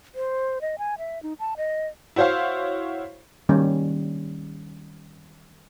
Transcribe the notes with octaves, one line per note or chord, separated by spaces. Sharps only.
C5
D#5
G#5
E5
D#4
A5
D#5
E4 F#4 C5 C#5 F5
D#3 G3 A#3 C#4